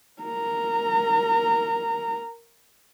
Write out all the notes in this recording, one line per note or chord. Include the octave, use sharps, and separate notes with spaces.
A#4 A#5